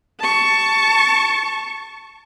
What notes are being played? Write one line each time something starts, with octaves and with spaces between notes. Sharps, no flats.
A5 C#6